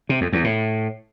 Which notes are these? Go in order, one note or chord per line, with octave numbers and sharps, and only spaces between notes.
C3
F2
E2
A2